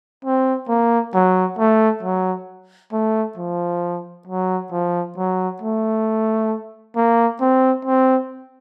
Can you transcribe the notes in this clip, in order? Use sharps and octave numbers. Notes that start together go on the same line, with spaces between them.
C4
A#3
F#3
A3
F#3
A3
F3
F#3
F3
F#3
A3
A#3
C4
C4